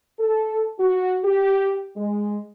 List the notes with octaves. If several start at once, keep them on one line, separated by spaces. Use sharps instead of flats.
A4
F#4
G4
G#3